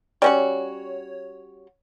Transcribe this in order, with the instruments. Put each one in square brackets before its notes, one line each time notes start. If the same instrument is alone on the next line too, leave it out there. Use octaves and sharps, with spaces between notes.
[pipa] G3 C#4 F#4 [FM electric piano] C#5